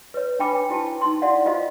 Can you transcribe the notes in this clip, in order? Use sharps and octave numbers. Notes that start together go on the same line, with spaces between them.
B4 C#5
D4 B4 G5 B5 D6
E4 F#4 C5 G5 A5
D#4 C6
E4 F#4 D5 F5 F#5
F4 F#4 C5 D#5 F5